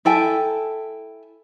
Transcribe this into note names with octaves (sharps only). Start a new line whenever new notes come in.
E4 A4 G5 G#5